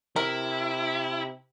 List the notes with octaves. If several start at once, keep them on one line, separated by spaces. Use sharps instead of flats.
C3 E4 A#4